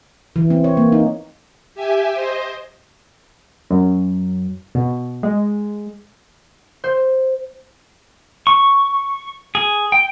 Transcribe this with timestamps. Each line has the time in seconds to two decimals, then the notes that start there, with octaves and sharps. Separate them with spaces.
0.36 E3
0.50 C4
0.64 C#5
0.77 A#3
0.92 D#4
1.74 G4 E5 G#5
2.14 C5 D#5
3.70 F#2
4.75 B2
5.23 G#3
6.84 C5
8.47 C#6
9.55 G#4
9.92 G5